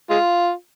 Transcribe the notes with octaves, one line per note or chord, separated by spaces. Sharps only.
G#3 F4